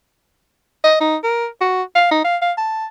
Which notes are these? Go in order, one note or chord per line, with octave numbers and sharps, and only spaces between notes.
D#5
D#4
A#4
F#4
F5
D#4
F5
F5
A5